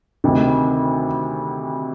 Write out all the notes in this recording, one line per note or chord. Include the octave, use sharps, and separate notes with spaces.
D2 C3 D#3